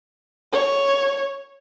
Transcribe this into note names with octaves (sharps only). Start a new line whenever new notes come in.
C#5